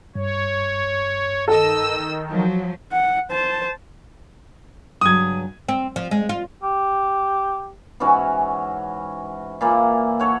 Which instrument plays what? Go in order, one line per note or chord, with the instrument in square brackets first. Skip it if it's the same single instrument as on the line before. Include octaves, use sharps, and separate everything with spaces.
[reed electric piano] G2 [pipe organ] C#5
[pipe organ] D#3 [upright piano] A4 [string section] D#5 E6
[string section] F3 F#3
[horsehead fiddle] F#5
C5 A5
[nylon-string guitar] G2 C#3 F#3 [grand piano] D#6 G#6
[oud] C4
F3
G#3
F4
[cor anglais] G4
[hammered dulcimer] G#2 E3 C#4 F#4
A#2 E3 A#3
A4 C#5 F#5